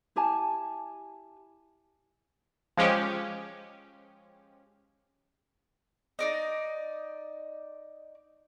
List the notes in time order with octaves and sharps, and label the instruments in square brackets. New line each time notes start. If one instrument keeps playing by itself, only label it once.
[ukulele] E4 G4 G#5 A5
[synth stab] F3 G#3 C#4 G4
[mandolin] D#4 D5 D#5